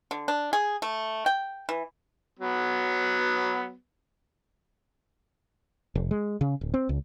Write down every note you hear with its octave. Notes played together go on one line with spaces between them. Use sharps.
D3
D4
G#4
A3
G5
E3
F#3 B3
F1
G#3
C#3
D1
C4
C#2